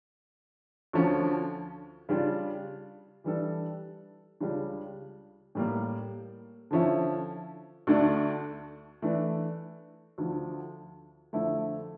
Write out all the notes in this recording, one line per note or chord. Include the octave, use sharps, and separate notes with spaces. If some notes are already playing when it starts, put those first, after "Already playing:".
D2 D3 F3 C#4 F4
C#3 G3 D4 F4
E3 G3 D4 A4
C#2 C#3 G3 D4
A2 G3 A#3
D3 F3 C#4 E4
D2 D3 A3 D4
E3 A3 D4
D2 D3 F3
F2 D3 A3 E4